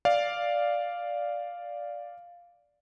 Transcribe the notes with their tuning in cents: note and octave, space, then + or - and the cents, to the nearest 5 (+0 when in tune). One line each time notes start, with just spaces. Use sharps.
D5 -5 F5 +0